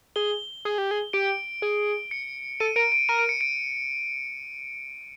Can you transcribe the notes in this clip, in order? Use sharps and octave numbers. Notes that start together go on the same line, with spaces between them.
G#4 G7
G#4
G4
G#4
G4 D7
G#4
C#7
A4 D#7
A#4 D7
D7
A#4 D#7
D7
C#7
D7